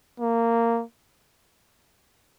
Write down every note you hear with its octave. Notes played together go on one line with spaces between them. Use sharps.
A#3